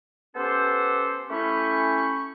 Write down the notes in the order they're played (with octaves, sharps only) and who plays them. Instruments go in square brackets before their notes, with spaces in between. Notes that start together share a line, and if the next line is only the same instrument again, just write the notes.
[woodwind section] B3 C#4 G4 A4 C5
A3 C#4 E4 G4 B5 C#6